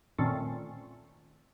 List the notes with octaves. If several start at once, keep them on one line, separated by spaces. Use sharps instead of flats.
A#2 D#3 A3 C4 C#4 A4